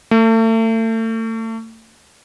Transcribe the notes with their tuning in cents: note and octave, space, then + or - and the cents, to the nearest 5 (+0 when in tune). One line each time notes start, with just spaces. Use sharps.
A3 +35